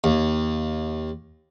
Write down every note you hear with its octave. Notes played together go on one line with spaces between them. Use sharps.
D#2